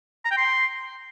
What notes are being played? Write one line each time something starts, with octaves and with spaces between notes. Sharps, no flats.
A#5
G5
C6